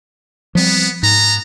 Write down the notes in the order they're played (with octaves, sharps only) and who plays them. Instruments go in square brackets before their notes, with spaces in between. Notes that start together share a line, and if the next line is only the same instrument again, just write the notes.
[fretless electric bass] F3 G3 C4 [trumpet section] B3
[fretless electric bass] G#2 [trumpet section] B3 A#5